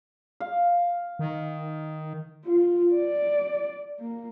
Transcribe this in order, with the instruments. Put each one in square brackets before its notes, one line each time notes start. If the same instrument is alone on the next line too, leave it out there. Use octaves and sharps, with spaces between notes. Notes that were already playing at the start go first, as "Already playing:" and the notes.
[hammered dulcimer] F5
[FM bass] D#3
[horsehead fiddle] F4
D5
A#3